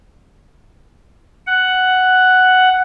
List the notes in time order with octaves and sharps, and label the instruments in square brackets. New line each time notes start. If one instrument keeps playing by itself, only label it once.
[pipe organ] F#5